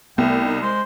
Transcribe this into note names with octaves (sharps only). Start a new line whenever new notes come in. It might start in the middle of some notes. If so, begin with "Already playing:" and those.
C2 A3 B3 G5
D#4
G#3 C5